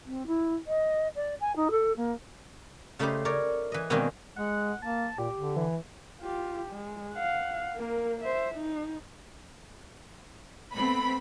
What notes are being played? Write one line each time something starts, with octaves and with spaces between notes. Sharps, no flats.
C4
E4
D#5
D5
G#5
D#4
A4
A#3
C#3 A3 D#4 E4 G4 C5
A#4 C#5 D5
E3 D#5
B2 D#3 G#3 A#3 C4 D4
G#3 F#5
A#3 A5
A#2 G4
D3
E3
F4 G4
G#3
F5 F#5
A#3 A#4
C5 E5
D#4
A3 B3 C4 B5